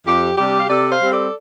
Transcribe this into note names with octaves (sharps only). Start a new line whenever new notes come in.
F2 G4
C3 G3 D4 G4
F5
C3 A4 D5
C5 F5
G3 C4
A4 D5